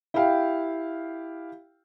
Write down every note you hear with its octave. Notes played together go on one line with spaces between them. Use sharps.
E4 G4 F5 G5